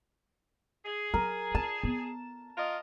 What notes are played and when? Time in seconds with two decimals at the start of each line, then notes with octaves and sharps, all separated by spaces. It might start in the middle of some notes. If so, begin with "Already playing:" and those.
0.85 G#4
1.14 F#3 A#4
1.55 F4 A5
1.83 B3
2.56 F4 A#4 D#5